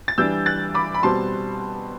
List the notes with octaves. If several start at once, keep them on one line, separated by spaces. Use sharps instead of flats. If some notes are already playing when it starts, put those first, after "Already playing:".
A6
E3 G3 D4 E6 G6
F#6 A6
B5 D6
B5
B2 G3 C4 A5 C6